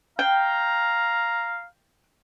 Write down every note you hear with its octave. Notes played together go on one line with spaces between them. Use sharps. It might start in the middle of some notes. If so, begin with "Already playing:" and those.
F5 G5 A#5